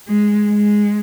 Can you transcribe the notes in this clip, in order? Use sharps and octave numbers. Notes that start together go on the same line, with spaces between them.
G#3
G#3